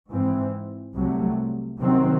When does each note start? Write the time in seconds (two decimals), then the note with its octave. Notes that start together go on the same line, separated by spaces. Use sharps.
0.10 G#2 E3 C4
0.94 C2 C3 F#3 A3
1.79 C3 D#3 F#3 C4